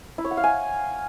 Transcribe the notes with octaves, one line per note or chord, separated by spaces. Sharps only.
E4
C#5
F#5
F5
G#5